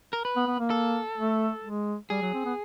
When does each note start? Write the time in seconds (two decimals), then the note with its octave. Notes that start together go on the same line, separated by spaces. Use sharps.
0.13 A#4
0.25 B4
0.36 B3
0.47 B3
0.59 A#3
0.70 A4
1.18 A3
1.64 G#3
2.10 G3 G#4
2.21 F#3
2.33 C4
2.45 B3